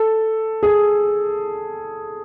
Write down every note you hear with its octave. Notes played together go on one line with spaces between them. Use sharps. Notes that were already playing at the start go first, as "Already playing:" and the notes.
Already playing: A4
G#4